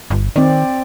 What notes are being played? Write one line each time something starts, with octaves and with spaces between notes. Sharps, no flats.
G1
D#3 C4 D5